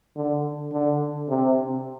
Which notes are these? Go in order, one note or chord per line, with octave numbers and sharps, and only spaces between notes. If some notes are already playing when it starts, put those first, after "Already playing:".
D3
D3
C3